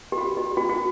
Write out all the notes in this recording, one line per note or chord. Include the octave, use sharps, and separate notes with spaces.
G4
F#4
G4
F#4
F#4